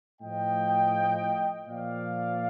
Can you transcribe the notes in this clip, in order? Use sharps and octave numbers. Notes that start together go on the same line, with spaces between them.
A2 F3 D#5 G5
A#2 F3 D5 F5